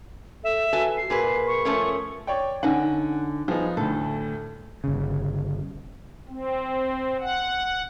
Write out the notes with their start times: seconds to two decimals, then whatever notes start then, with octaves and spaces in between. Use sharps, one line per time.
0.44 A4 E5
0.73 F#4 A4 B4 G#5
0.97 C7
1.10 A#2 G#4 A#4 B4
1.47 C#6
1.65 F3 A3 C#4
2.27 C#5 D5 G5
2.63 D3 C#4 D#4 F#5 G#5
3.48 F3 B3 D#4 G#4
3.77 D2 A2 A4
4.84 G1 C#3
6.28 C4
7.20 F#5